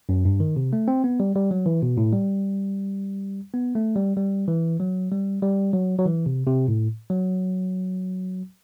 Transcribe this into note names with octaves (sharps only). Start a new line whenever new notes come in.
F#2
G2
D#3
C3
A3
C4
B3
G3
G3
F#3
E3
B2
A2
G3
B3
A3
G3
G3
E3
F#3
G3
G3
F#3
F#3
E3
C3
C3
A2
F#3